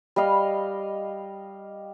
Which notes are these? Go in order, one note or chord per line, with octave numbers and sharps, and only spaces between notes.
G3 D#5 F5